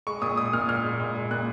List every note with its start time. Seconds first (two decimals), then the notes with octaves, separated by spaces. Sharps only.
0.07 G#3 C#6
0.22 A#2 D#6
0.37 G#3 D#6
0.53 A#2 F6
0.69 A#2 F6
0.84 G#3
1.00 A#2
1.15 G#3
1.31 A#2 F#6